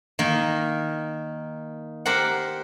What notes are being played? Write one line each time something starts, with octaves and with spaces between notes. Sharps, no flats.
D#3 A#3
G4 A#4 C5 F#5